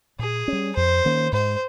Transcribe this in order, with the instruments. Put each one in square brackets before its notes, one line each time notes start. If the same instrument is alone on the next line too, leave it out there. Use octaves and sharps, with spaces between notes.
[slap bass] A#2 [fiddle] G#4
[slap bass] G3 C#4
[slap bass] F2 [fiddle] C5
[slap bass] D#3 A#3 C#4
[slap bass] G#2 [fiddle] C5